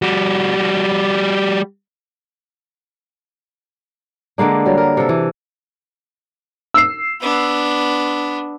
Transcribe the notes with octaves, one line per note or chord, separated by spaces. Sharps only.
G3 F#4
D3 G#3 A#3 D4
F#3 G3
A#4
C3 A4
E3
E6 C7
B3 D4